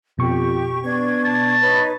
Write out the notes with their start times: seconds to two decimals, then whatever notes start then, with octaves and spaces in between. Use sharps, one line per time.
0.19 F2 B2 G4 C#6
0.84 B3 D4 G#6
1.25 A5
1.61 D#4 B4 C#5